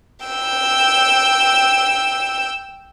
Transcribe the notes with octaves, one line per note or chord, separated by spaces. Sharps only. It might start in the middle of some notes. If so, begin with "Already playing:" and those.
G5 E6